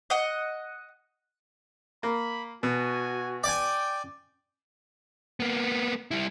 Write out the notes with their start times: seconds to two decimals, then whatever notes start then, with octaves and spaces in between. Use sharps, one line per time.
0.10 D#5 F#5
2.03 A#3 B5
2.63 B2 F#4 G#5
3.44 D5 G5 G#5
5.40 A#3 B3
6.11 G3 E4